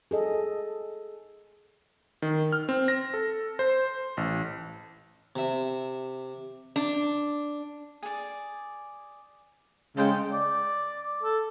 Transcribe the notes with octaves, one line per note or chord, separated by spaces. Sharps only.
G#4 A4 D#5
D#3
F6
C4
A#6
A4
C5
A1
C3 E5
D4
G#4 D5
C#3 G#3 A4 C5 G5
D5
A4